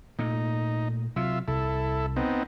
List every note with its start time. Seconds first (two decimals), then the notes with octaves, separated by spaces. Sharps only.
0.19 A#2 A3 D#4
1.16 C3 F#3 F4 E5
1.48 C2 E4 A4
2.16 B3 C4 D#4